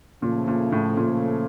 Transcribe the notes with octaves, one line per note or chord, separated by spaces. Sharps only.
A#2 C#3 F3 A3
A#2
A2
A#2